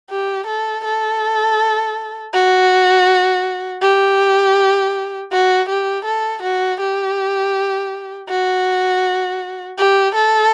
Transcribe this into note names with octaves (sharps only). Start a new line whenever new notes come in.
G4
A4
A4
F#4
G4
F#4
G4
A4
F#4
G4
F#4
G4
A4